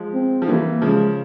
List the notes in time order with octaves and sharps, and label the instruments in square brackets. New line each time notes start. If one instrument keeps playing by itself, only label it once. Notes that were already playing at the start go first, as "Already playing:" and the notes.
Already playing: [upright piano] F3 G#3
[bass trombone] C4
[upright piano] F3
[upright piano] E3 G3 [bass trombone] A#3
[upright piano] C#3 F3 [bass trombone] G#3